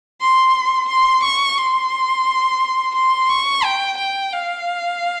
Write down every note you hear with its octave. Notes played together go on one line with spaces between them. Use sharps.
C6
C6
C#6
C6
C6
C#6
G5
G5
F5